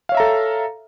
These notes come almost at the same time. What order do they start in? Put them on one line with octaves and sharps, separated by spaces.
F5 C#5 E5 A#5 A4